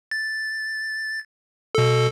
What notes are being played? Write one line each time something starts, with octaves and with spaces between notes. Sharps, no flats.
A6
B2 A4